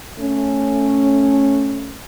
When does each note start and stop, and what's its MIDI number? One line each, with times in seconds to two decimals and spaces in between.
0.20 2.00 57
0.20 2.00 61